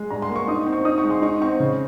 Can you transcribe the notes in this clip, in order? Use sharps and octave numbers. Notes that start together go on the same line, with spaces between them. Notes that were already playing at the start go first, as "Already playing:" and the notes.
Already playing: G#3
G2 A#5
C6
A#3
C#6
D#4 D#6
C4
C#6
D#4 D#6
C#6
G#3
C6
D#4 C#6
C4 C#6
C#3